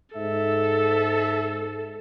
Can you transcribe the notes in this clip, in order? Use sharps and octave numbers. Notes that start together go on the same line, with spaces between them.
G#2 A4 E5